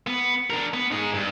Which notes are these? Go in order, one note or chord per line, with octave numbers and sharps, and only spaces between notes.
B3
D4 A#4
B3
D#4 G#4
G2